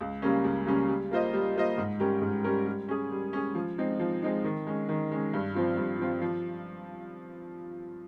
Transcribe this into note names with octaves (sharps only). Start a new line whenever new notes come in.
C#2
C#3 G3 A#3 C#4
C#2
C#3 G3 A#3 C#4
G3
A#3 F4 C5 D#5
G3
A#3 F4 C5 D#5
G#2
G3 C#4 G4 A#4
G#2
G3 C#4 G4 A#4
G3
C#4 G#4
G3
C#4 G#4
F3
G#3 C4 D#4
F3
G#3 C4 D#4
D#3
G#3 C#4
D#3
G#3 C#4
G2
F3 C4 F4
G2
F3 C4 F4
F3